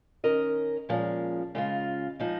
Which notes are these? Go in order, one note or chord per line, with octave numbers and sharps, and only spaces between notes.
D#3 C#4 A#4 D#5
A#2 F3 G#3 C#4 G#4
C#3 G#3 F4
F3 G#3 D#4